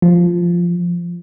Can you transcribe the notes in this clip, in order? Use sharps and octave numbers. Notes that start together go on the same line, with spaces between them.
F3